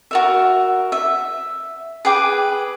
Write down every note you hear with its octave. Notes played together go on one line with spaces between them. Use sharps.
F#4 A#4 E5
E5
G#4 B4 G5 D6